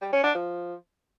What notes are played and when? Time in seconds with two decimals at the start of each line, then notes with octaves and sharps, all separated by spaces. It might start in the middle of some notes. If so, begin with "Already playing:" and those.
0.02 G3
0.13 C#4
0.24 D4
0.35 F3